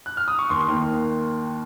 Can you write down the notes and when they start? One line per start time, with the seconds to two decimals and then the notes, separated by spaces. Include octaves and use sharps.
0.06 F#6
0.17 F6
0.28 D#6
0.39 C#6
0.50 D#2 C6
0.68 D#3 A#3